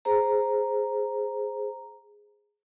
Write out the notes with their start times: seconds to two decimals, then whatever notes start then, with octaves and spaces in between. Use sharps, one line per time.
0.05 G#4 C5 A#5